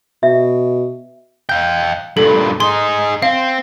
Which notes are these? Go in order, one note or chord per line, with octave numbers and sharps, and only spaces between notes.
B2 E5
F5 G5 G6
G2 A#2 A4
D#4 G#4 C6
C4 F5